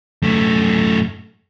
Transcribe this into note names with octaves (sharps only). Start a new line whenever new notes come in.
F#2 A3